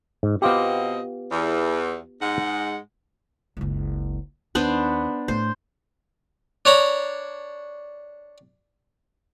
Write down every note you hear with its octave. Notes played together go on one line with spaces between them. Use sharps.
G#2
B2 B3 C4 F4 G4 D#5
E2
G#2 G#3 F#5
F#1 C#2
D#2 B3 D4 C5
A2 A3 C5
D4 C#5 A#5 B5